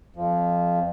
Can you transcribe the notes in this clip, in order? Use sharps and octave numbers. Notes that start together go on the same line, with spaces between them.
F2 F3